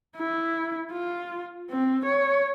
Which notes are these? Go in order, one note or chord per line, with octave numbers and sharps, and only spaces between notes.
E4
F4
C4
C#5